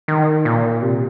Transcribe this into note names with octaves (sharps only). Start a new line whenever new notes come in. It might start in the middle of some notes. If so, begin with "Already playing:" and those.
D#3
A#2
C3